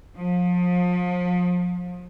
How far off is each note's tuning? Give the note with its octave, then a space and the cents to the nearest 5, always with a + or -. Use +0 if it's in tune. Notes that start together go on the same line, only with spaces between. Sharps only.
F3 +35